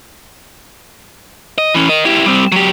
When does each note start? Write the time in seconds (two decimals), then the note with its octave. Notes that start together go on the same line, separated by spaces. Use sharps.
1.58 D#5
1.74 E3 C#4
1.89 A#4 D#5
2.05 E4 G4
2.26 G3 C4
2.52 F#3 G4